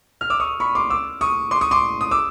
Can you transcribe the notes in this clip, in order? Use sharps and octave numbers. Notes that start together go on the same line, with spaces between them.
F6
D6 E6
C#6 D#6
B5 C#6
C6 D6
D6 E6
C#6 D#6
C6 D6
C#6 D#6
C6 D6
D#6
D6 E6